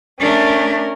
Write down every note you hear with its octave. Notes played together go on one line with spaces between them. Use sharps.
A3 C#4 D4 A#4